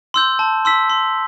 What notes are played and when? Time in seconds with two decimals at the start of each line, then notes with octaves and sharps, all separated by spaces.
0.14 C6 E6 G6
0.39 A5
0.65 C6 E6 B6
0.90 C6